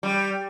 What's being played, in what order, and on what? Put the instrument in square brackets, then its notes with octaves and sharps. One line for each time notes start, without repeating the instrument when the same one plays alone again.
[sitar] G3